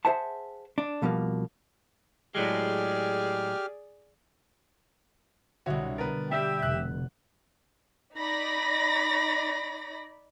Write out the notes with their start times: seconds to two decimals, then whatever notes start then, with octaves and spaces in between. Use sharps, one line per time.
0.05 G#4 B4 C5 E5 F#5 A5
0.78 D4
1.02 B1 B2 F3 G3 A3 A#3
2.35 A2 F#3 G#3 G4 G#4 D5 F6
5.66 C2 B2 D3 F#4 C#5 E5
5.98 B3 A#4 B4 A6
6.31 G3 G4 E5 G5
6.62 F1 F#6
8.16 D#4 D5 B5 A#6